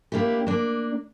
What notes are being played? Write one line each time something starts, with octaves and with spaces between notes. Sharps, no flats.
A#3 D4 E4 G4
A#3 D4